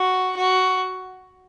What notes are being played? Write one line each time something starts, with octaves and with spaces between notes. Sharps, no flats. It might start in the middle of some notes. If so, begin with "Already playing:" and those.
Already playing: F#4
F#4